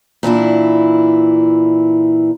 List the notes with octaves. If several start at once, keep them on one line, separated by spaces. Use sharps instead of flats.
A#2 E3 D4 E4